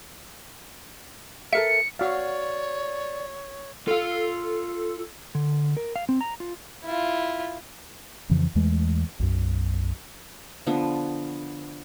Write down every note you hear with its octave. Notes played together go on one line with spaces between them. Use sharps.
A4 A#4 E5 C#7
F#4 C#5 D5 F5
F4 A4 F5
D3
A#4
F5
C4
A#5
F4
E4 F4
F2 C#3 E3 F3
E2 E3 G#3 A3
B1 F#2
D3 F3 B3